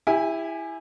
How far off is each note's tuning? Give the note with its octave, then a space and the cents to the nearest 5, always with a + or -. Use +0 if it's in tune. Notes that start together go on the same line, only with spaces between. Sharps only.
E4 +0 G4 +35 G#5 +0